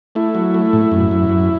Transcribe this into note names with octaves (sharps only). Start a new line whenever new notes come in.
A3 E4
F#3
A3
A2
F#2
F#2
F#2